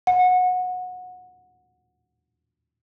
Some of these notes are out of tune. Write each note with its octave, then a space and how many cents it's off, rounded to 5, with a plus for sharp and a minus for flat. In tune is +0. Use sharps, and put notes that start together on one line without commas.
F#5 -20